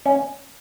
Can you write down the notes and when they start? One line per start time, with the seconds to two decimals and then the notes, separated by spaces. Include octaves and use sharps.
0.06 C#4